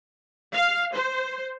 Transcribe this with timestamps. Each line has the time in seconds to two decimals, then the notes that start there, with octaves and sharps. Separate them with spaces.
0.53 F5
0.94 C5